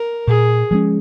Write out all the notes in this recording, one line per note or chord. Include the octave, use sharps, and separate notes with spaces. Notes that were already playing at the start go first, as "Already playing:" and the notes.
Already playing: A#4
A#2 G#4
F3 G#3 C#4